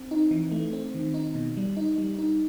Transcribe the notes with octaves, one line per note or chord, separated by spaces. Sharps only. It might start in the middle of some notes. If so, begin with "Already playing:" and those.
Already playing: C4
D#4
E3
A3
C4
D#3
D#4
B2
G3
D#4
G3
D#4